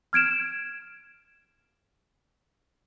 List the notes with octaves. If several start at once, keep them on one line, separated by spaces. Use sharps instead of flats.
F6 G#6 D7 E7